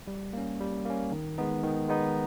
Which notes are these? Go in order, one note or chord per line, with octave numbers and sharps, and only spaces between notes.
G3
A#3 C#4
G3
A#3 C#4
D#3
G#3 B3 D#4
D#3
G#3 B3 D#4